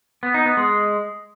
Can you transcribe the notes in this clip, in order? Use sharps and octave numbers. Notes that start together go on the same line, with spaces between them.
B3
D#4
B3
G#3